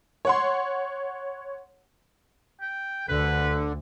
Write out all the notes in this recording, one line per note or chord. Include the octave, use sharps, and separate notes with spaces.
C#5 F#5 C6
G5
D2 D3 B4